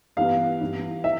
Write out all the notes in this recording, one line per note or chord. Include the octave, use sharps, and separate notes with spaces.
G2 E3 B3 F5
G2 E3 B3
E3 E5